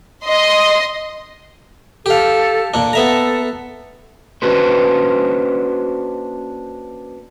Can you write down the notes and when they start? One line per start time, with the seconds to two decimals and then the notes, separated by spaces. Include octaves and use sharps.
0.24 D#5 C6
2.06 G4 A4 F5
2.74 A#2 D4
2.93 B3 A4 E5 A#5
4.42 A#3 C#4 D4 F#4 B4 C5